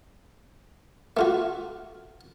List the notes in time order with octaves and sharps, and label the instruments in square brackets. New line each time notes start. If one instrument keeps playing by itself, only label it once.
[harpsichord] A3 F4 F#4